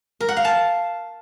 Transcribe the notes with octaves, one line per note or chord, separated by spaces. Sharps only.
A#4
F#5
F5
A5